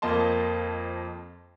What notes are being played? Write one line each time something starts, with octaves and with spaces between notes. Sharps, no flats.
F2 F3 A#3 D#5 A5 C6